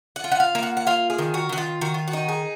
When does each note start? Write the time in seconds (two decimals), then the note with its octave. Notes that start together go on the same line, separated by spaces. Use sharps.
0.16 F#5
0.24 F4
0.32 F#5
0.40 F5
0.55 A#3
0.63 F#5
0.77 F#5
0.87 F4 F5
1.10 G#4
1.18 D#3
1.34 F#4
1.49 D#3 F#4
1.58 F4
1.81 D#3 F#4
1.94 F4
2.08 F#4
2.13 D#4
2.29 G#4